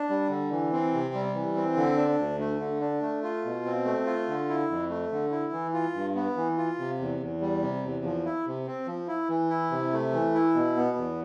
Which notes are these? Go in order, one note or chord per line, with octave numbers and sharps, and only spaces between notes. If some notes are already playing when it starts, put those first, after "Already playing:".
Already playing: D4
G3
D3
E3
C4
C3
G3
E3
C4
D3
D4
D2
A3
D3
D4
A3
F4
B2
C4
A3
F4
D3
E4
F2
A3
D3
E4
E3
F4
G2
B3
E3
F4
C3
E2
E2
G3
C3
E2
F3
E4
C3
C4
F3
E4
E3
E4
C3
A3
E3
E4
B2
B3
E2